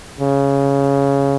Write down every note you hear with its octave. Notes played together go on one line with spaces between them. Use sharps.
C#3